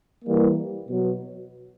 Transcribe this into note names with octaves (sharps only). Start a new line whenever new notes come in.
E3 G3 A#3
B2 F#3 B3